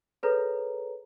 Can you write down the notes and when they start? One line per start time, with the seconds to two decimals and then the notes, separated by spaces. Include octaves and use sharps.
0.23 G#4 A4 B4 C#5 A#5